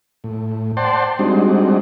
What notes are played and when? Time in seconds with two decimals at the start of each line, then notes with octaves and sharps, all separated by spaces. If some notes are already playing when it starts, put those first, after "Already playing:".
0.24 A2
0.77 C5 D5 F#5 G5 A5 C6
1.19 G3 G#3 C4 D4 D#4 F#4